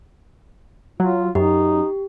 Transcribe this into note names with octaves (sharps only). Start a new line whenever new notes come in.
F#3 F4
F#2 D#4 G4